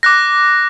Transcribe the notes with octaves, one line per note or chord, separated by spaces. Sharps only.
D6 F#6 A#6